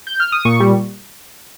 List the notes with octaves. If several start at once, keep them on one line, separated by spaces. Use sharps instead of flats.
G6
F6
D#6
A#2 C#6
G3